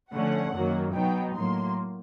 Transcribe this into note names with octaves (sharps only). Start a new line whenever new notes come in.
D3 F3 A3 C#4 F#5
F#2 D#3 F#3 A#3
B2 F#3 B3 D#4 G5
A2 F#3 A#3 C6